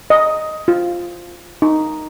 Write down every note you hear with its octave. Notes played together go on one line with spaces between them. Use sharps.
D#5
F4
D#4